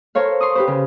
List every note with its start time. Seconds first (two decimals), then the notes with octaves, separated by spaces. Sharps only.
0.15 A4 A#4 C5 C#5 F5
0.40 C6 C#6 D#6
0.55 G4 B4 C5
0.67 C#3